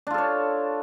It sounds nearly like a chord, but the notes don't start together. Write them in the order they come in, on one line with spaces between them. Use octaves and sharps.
D4 F4 A4 C#5